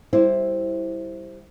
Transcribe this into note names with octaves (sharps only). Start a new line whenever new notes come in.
G3 E4 C5